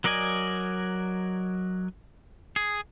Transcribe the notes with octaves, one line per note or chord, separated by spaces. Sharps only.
F#3 A#4 D5 D#5 G#5
G#4